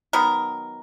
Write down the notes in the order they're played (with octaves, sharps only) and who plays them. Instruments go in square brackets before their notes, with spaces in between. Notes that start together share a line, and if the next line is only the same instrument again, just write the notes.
[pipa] D#3 F#3 B3 A#4